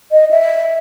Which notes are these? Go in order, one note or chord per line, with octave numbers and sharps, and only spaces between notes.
D#5
E5